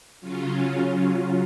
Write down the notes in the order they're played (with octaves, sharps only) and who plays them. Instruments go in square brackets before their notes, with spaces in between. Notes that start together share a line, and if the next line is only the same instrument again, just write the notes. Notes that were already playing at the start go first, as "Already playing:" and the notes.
[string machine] C#3 F#3 C#4 F4